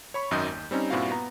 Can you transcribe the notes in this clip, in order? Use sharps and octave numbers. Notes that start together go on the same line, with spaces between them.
C#5 B5 C#6
G#1 F#2 D#3 D#5 D#6 G6
D#2
G3 C4 C#4 D#4
G2 A#2 C4 E4 F#4 F5
B3 A#5